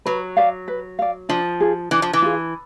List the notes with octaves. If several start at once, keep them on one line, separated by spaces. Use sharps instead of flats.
F#3 B4
D5 F5
B4
D5 F5
F3 D4
F4 G#4
E3 D4
F3
E3
F4 G#4